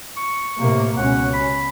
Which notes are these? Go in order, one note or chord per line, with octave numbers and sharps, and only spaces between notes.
C#6
A2 C3 A#3
C#2 B2 C#4 F#5
B5